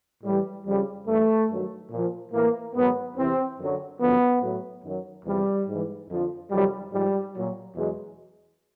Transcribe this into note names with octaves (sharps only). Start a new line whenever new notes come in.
A2 E3 G3
F2 C#3 F3 G3
G2 E3 A3
G2 D#3 F#3
A#2 F3
A2 E3 A#3
G#2 D#3 F#3 B3
E2 C3 E3 C4
F#2 D3 F#3
F#2 D3 F3 B3
A2 F#3
F#2 D#3 F#3
E2 C3 F3 G3
G#2 E3
F2 D3 F3
F2 C3 D#3 F#3 G3
G#2 F3 G3
A#2 F#3
E2 B2 F#3 G#3